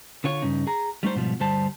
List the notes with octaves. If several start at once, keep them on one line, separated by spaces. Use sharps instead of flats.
D3 F4 C#5
G2 C#3 D#4
G#4 A#5
G3 A3 D#4 C5
G#2 B2 F3 G3
D2 G2 G3 C5 A5